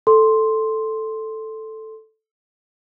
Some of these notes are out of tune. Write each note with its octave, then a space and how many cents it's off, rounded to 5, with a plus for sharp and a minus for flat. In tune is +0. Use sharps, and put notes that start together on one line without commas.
A4 +0 C6 +0